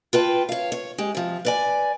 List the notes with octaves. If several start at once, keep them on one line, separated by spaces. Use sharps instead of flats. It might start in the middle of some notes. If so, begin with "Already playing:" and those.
F4 B4 G5 A5
C#5 F5
C#5
G#3 G4
C3 F3
B4 D5 G#5